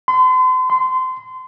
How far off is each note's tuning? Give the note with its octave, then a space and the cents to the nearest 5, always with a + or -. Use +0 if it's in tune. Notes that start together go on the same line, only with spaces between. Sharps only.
C6 -40
C6 -25